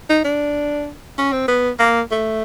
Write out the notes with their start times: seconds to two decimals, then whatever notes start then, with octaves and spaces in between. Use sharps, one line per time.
0.10 D#4
0.24 D4
1.18 C#4
1.33 C4
1.48 B3
1.79 A#3
2.11 A3